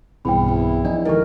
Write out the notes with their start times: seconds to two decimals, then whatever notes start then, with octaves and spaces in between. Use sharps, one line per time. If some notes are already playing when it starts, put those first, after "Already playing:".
0.25 B1 E2 G2 C4 G5 B5
0.48 E4
0.85 F3 D4 D#4 D5
1.05 D#3 G#3 G4 A4 A#4 D#5